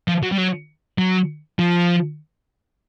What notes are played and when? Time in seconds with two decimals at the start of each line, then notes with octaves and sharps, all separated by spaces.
0.08 F3
0.23 F#3
0.32 G3
0.38 F#3
0.98 F#3
1.59 F3